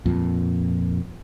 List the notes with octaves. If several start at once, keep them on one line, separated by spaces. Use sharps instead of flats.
F2 A#2